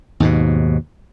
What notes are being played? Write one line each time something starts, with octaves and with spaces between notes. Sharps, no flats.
D#2 G#2 B2